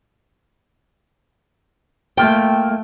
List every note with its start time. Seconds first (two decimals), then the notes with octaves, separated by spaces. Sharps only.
2.17 A3 A#3 F4 G5